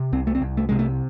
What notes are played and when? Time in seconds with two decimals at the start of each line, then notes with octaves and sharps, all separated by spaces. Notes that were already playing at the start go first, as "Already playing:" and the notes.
Already playing: C3
0.13 C2 C4
0.27 A3
0.35 C4
0.42 C2
0.57 A3
0.69 C3 G#3
0.79 A3